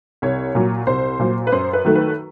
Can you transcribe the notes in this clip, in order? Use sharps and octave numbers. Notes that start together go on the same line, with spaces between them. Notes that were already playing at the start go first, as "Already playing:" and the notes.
C2 C#5
A#2 F#3
C2 C5
A#2 F#3
B4
F#2 C5
B4
D#3 F#3 A3
B4